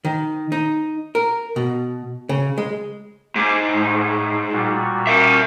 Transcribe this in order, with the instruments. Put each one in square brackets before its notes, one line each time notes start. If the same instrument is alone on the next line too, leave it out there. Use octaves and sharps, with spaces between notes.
[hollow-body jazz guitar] D#3
D#4
A#4
B2
C#3
G#3
[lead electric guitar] G#2 [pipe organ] G#5 D6
[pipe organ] A2
A#2 G3 F#4
[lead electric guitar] A#4 E5